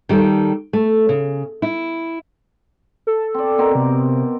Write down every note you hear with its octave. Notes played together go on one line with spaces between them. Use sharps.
D#3 G3 A4
A3
C#3
E4
A4
C4 D5
B2 C4 A#4
C3